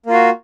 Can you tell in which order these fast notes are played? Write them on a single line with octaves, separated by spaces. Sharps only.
A#3 F4 F#4